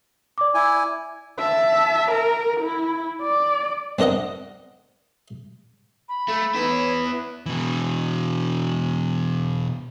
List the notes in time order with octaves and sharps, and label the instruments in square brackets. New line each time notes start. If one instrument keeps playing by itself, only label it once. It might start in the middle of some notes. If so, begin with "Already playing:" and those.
[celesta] D5 D6
[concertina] E4 G#5
[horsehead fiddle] E5 A5
A#4
E4
D5
[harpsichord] C4 D4 A#4 D#5 F#5
[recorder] B5
[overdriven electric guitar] A3
[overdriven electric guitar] B3 E4 [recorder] D#4
[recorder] C#5
B4
[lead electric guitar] B2 E3